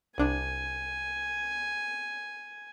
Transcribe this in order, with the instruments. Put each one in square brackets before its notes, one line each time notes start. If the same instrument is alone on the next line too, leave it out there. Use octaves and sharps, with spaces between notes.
[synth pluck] C2 D4 [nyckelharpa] G#5